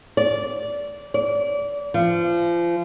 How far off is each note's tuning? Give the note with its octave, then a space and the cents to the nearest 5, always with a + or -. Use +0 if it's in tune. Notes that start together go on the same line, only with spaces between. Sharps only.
D5 -20
D5 -30
F3 -30